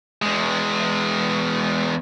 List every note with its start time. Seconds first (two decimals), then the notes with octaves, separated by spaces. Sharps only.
0.22 E2 G#3